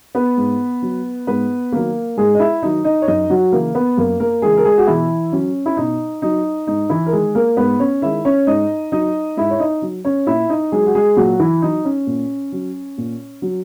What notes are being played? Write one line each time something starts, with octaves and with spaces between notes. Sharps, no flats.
B3 B4
G#2
F#3
G#2 B3 B4
D#3 F#3 A#3 A#4
G#2 G#3 G#4
D#5
E4 E5
D#3 F#3 D#4 D#5
D#4 D#5
C#5
F#2 D#4 D#5
F#3 F#4
C#3 E3 A#3 A#4
B3 B4
F#2 A#3 A#4
A#3 A#4
C#3 E3 G#3 G#4
A#4
G#3 G#4
F#4
B2 E3 E4
F#3 C#4
E4
B2 D#4
F#3 D#4
G#2 D#4
E3 E4
A#4
D#3 G#3 G#4
A#3 A#4
G#2 B3 B4
C#4 C#5
D#3 G#3 E4 E5
C#4 C#5
G#2 D#4 D#5
F#3 D#4 D#5
G#2 E4 E5
C#5
D#4 D#5
F#3
C#4 C#5
A#2 E4 E5
D#4 D#5
F#3 G#3 G#4
F#4
G#3 G#4
A#2 F#3 F#4
E3 E4
F#3 D#4
C#4
A#2
F#3
A#2
F#3